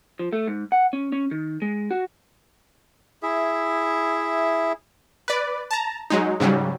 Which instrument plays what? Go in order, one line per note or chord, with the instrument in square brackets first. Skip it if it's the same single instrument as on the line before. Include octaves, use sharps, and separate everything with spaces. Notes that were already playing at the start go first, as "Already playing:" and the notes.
[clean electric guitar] F3
A3
G#2
F#5
C#4
C#4
D#3
G#3
F#4
[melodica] E4 G#4 E5
[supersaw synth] B4 D5
A5 A#5
F#3 G#3 D#4
G#2 C#3 F#3 G3